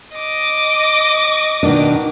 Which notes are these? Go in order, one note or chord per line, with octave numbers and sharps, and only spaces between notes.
D#5 D6
B2 D#3 D4